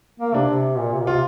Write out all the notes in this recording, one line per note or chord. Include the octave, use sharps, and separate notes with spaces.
A#3
C3 D4
C3
A#2
C3
A#2
C3 F4